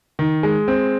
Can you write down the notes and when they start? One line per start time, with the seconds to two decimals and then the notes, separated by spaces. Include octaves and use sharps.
0.19 D#3
0.43 G#3
0.68 C4